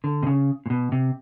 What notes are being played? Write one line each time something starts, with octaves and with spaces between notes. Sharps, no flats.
D3
C3
C#3
A#2
B2
C3